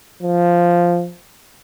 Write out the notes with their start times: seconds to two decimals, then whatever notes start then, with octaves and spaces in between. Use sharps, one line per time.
0.23 F3